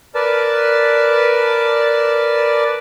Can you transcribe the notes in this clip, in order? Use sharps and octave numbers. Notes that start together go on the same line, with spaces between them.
A#4 B4 D5 A5